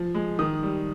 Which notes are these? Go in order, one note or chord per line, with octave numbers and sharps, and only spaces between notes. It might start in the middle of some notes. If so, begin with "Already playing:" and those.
Already playing: F3
G#3
D#3 D#6
G3